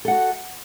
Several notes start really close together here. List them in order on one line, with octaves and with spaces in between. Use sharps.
A4 F#5 F#4